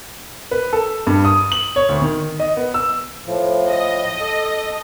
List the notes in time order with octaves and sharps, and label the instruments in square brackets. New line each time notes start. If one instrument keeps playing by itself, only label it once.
[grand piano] B4
A4
G2
D#6
F#7
C#5
D2
D#3
D#5
B3
E6
[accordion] A2 F3
[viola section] D#5
[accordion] A4